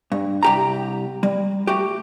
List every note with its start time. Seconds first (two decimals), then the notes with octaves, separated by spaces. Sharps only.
0.12 G2
0.43 C2 G4 A#5
1.23 G3
1.67 A3 F#4 G4